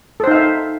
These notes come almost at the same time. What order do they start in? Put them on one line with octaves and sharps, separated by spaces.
A4 C5 D#4 F5 E5